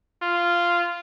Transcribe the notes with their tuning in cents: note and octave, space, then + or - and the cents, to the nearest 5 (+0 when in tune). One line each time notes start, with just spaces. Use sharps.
F4 -10